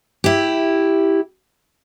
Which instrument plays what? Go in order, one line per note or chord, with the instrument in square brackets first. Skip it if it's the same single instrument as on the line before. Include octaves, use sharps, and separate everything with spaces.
[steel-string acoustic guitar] E4 G4